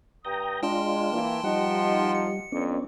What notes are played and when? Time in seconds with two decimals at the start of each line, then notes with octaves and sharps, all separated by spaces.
0.25 G2 G5 A#5 D#6
0.63 G#3 D4 F4 G5 A5 C6
1.12 E3 A#3
1.44 F3 G3 D#4 F#5
2.15 C#7
2.52 F2 B3 C#4 D4